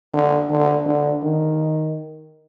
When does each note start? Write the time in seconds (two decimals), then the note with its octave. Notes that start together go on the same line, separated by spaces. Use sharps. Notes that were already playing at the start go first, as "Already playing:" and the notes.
0.14 D3
0.50 D3
0.86 D3
1.23 D#3